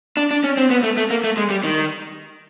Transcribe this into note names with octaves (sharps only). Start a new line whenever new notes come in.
D4
D4
C#4
C4
B3
A3
A3
A#3
A3
G#3
G3
D#3